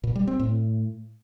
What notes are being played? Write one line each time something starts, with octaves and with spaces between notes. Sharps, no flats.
A#2
G3
C4
A2